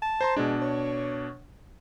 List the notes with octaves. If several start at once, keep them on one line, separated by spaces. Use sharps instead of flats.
A5
C5 A#5 C6
B2 G#3 D4
C#5